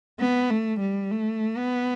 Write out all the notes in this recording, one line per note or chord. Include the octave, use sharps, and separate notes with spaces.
B3
A3
G3
A3
B3